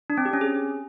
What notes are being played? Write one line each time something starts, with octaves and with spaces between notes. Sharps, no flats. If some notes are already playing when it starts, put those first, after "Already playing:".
D4
C4
G4
C#4
G#4